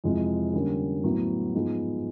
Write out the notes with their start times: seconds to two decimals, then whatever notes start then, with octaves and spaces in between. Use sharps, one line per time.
0.04 F2 C3 E3 G#3 C4
0.53 D3 G3 A#3 C#4
1.04 A2 F#3 B3
1.54 G#2 F3 G#3 B3